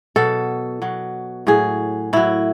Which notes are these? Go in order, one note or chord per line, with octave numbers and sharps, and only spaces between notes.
B2 F#3 A4
B2 F#3
A2 F#3 G#4
A2 F#3 E4